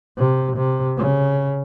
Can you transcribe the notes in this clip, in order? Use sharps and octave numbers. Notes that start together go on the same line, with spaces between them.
C3
C3
C#3